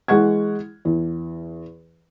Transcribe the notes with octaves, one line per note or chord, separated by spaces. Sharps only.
E3 G#3 F#5 C#6 G#6
E2